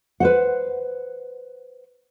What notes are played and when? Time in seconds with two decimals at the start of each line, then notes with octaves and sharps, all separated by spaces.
0.20 B4 C5 F#5